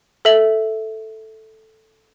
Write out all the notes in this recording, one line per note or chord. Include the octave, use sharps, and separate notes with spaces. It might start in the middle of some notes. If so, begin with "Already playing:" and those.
A4 E5 F#7